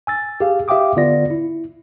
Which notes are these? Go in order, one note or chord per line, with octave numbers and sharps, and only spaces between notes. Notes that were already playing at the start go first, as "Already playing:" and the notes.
G#5 E6 A6
G4 G#4 F5
G4 E5 F5 G5 D6 D#6
D3 B3 F4 D5 A#6
E4